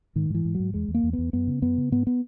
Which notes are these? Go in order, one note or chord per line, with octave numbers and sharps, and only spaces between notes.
G#2 D#3
G#2 E3
G#2
F#3
G#2
E2 G#3
E2
A#3
E2
B3
E2
F#2 B3
C#3
F#2 B3
C#3
G#2 B3
B3